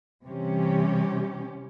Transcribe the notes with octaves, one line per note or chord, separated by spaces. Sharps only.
C3 E3 G3 C#4 G4